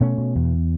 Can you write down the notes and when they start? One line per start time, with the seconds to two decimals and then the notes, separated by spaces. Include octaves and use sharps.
0.01 B2 A3 C#4
0.18 B2
0.35 E2